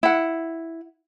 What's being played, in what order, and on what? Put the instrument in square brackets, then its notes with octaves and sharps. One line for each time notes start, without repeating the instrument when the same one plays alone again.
[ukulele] E4 F#5